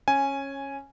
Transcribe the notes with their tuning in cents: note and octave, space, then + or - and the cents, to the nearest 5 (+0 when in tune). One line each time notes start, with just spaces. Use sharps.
C#4 -15 G#5 +0